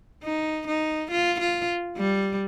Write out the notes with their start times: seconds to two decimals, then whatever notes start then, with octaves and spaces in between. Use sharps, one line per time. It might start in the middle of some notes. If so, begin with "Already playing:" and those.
0.24 D#4
0.67 D#4
1.11 F4
1.40 F4
1.97 G3